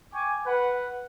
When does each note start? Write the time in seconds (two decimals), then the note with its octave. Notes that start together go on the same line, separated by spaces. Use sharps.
0.13 G5 G#5 C#6 D6
0.46 B4 F#5